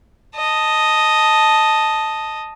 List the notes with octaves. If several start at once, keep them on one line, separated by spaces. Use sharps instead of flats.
D#5 A5